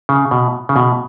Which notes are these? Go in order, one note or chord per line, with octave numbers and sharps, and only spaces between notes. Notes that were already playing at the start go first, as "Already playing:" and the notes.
C#3
B2
C#3
B2